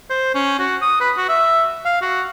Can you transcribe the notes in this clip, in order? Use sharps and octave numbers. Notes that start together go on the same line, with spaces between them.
C5
C#4
F#4
D#6
B4
F#4
E5
F5
F#4